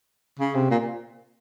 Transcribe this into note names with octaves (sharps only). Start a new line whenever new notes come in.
C#3
C3
A#2